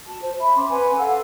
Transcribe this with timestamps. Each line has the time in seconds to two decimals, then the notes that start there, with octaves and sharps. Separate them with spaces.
0.06 F#4 A5
0.21 C5
0.39 E5 B5
0.55 C#4 C6 D6
0.69 B4 F#5 G#5
0.97 A4 F5 F#5 E6